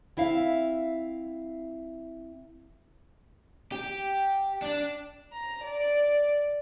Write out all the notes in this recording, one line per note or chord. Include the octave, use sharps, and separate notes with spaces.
C4 E4 E5 F5
G4
D4
A#5
D5